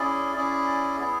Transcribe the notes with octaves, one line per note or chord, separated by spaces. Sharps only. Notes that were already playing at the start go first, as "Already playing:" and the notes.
Already playing: C#4 E4 G#4 D5
C#4 E4 G#4 D5
B3 E4 G#4